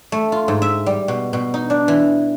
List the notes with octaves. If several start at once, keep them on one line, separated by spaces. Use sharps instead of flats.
A3
F4
G#2
E5
G3
B2
B2
D#4
D4
E3